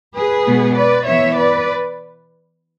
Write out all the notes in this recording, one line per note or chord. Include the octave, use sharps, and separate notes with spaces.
G#4 B4
B2 G#3 B3
B4 D5
E3 B3 C#5 E5
B4 D5